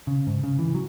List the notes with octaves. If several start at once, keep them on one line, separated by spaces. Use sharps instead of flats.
C#3
G#2
C#3
E3
F#3